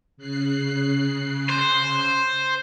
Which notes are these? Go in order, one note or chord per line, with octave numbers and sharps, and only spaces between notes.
C#3 F#6 C7
C5